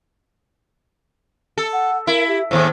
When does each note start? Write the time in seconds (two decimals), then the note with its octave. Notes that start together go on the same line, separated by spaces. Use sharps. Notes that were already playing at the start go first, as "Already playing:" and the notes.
1.58 A4
1.73 F#5
2.07 E4 A#4
2.28 G4
2.51 D#2 A2 C5